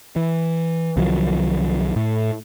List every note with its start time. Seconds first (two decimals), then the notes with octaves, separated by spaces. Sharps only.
0.16 E3
0.97 C2 D#3 F3 F#3
1.96 A2